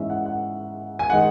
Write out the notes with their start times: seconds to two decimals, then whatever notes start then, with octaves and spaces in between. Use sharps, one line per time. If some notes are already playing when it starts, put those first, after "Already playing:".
Already playing: G#2 E3 G#3 C#4 E4 E5
0.10 F#5
0.26 F#5
0.99 G#5
1.10 D#3 G#3 D#4 F#5